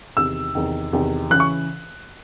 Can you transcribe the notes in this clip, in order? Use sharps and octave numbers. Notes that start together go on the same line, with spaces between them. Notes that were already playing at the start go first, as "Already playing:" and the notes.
E2 C3 D#3 E6
E2 C3 D#3
E2 C3 D#3
C#3 E3 F#6
C#6